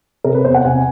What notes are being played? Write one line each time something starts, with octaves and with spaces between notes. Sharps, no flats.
C3 A#4
B4
E2 C5
F#5
C3 G#5